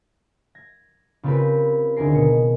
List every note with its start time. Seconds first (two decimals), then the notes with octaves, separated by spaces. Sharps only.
0.55 G#6 A#6
1.23 C#3 C4 F4 G4 A#4 B4
1.97 D2 D#3 G#4 A#4 C7
2.14 B2 C#7